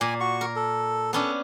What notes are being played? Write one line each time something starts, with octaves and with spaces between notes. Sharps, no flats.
A#2 D5 G#5
F#4 C#6
A#4
A4
B3 C#4 D4 A4